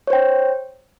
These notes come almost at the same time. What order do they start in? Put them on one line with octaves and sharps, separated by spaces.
C#5 C5 G5